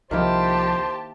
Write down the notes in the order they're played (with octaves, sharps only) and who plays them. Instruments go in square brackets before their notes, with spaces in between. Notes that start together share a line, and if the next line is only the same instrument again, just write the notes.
[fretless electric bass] C2 F3 [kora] D#3 A#3 E4 [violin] G4 A5 [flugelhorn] C5